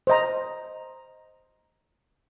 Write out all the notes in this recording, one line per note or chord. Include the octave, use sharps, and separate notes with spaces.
C5 D#5 A#5